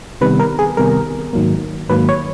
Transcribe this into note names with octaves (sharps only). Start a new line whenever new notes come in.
C3 D#3 G3 B3 B4
A#4
G#4
C3 D#3 G3 B3 A#4
G#2 D#3 F#3 A#3
G#2 D#3 F#3 A#3 B4
C#5